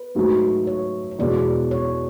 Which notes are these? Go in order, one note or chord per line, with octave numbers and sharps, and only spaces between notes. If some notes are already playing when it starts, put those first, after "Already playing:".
Already playing: B4
G#2 F#3 A3
C#5
C#5
E2 B2 G#3 D5
C#5